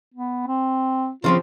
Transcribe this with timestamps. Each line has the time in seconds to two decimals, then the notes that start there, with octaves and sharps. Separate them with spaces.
0.14 B3
0.47 C4
1.24 C#3 F3 C4 F4